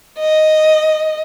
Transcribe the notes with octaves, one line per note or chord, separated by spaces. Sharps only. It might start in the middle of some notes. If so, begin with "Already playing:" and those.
D#5